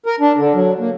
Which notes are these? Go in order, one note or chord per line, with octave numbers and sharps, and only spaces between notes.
A#4
D4
D3
F#3
A#3